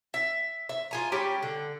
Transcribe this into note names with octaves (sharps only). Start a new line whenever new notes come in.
E5
E5
F4 G#5 A#5
G3 C#4 G4
D3